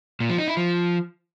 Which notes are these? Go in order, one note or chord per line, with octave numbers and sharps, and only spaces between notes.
A#2
F3
D#4
E4
F3